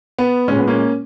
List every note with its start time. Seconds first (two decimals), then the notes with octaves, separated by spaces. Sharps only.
0.19 B3
0.48 A#2 G#3 C#4
0.58 B3
0.68 A#3 C#4